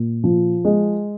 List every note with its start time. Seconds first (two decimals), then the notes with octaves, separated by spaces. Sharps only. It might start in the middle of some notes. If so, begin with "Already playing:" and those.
Already playing: A#2
0.24 F3
0.65 G#3